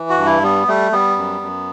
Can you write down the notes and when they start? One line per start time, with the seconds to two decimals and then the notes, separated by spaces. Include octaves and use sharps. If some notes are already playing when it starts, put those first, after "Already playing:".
Already playing: E3
0.10 F#4
0.18 G2
0.26 E4
0.43 G3 B3
0.68 G3 A3
0.92 G3 B3
1.17 F#2
1.42 F#2